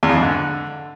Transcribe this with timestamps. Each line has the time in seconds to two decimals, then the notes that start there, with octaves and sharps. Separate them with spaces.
0.03 E2
0.09 F2
0.16 G#2
0.23 D3